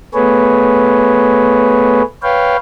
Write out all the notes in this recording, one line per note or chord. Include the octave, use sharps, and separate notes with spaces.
A3 B3 G#4 B4 C#5
B4 C#5 F5 G5